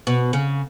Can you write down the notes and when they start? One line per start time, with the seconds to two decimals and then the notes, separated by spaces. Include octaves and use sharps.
0.07 B2
0.33 C#3